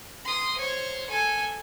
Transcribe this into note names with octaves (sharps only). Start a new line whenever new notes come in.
C6 D#6
C5 C#5
A4 G#5